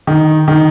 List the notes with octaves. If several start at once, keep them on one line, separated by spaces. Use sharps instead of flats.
D#3
D#3